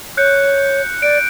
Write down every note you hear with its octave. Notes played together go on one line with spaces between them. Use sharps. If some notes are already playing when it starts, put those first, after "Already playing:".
C#5 F#6 G6 C#7
D5 D7